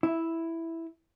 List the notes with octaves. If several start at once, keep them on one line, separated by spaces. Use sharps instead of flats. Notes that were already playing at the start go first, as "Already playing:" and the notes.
E4